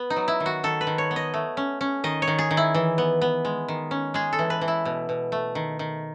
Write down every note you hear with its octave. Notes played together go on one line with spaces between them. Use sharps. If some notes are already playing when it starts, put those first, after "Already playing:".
Already playing: B3
D#4
F#3
E4
D#3
F#4
D#3 A4
B4
D#3
C#5
B3
D#5
A3
C#4
C#4
D#3 D#5
C#5
D#3
G#4
D#3
E4
E3
B3
B3
G#3
D#3
C#4
G#3 G#4
A4
E3
B4
E3
E4
B2
B2
A3
D#3
D#3